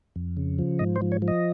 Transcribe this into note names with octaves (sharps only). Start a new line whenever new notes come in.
F2
C#3
F3
G#2 D#5
C5
F3
C#5
F3
D#5